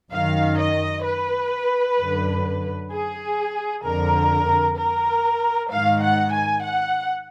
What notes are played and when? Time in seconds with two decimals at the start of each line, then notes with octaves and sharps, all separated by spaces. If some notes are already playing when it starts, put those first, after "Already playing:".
0.12 F#2 D#3 F5
0.58 D#5
1.05 B4
1.98 F#2 D3
2.91 G#4
3.84 F2 D3 A#4
4.78 A#4
5.71 G#2 D#3 F5
6.03 F#5
6.33 G#5
6.64 F#5